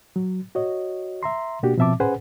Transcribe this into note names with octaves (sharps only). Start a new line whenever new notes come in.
F#3
F#4 C#5 D#5
E5 A#5 C6
B2 A#3 D4 F#4 G4
B2 F3 C4 E5 A5 D6
C#4 G#4 B4 C5 F#5 G#5